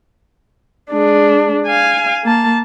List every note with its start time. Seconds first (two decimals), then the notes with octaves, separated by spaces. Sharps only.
0.91 G#3 D4
1.67 F5 G#5
2.24 A#3 A5